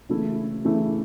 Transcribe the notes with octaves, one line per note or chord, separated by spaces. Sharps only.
C#3 E3 A3 E4
C#3 E3 A3 E4